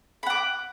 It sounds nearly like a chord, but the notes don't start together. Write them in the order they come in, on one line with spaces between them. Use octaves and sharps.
B5 F#5 D6